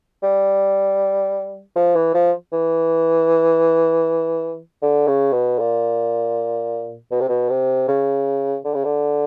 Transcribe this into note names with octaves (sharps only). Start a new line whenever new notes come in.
G3
F3
E3
F3
E3
D3
C#3
B2
A#2
B2
C3
B2
C3
C#3
D3
C#3
D3